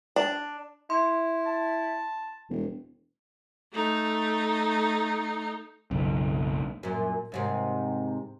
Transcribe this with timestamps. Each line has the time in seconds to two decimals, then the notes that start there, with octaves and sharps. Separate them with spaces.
0.16 D4
0.90 E4 C6
1.46 A5
2.50 E1
3.73 A3 D#4
5.91 F#1 B1
6.83 F#2 A#2
7.32 D#2 G#2 C3